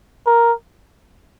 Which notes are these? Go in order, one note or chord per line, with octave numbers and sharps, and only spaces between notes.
A#4